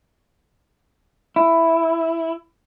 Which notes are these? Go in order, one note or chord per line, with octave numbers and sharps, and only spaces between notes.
E4